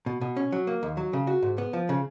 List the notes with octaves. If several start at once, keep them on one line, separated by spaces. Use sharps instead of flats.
B2
B2
C#4
F#3
A#3
D#2
F#3
C#3
F#4
G#2
B3
F3
C#3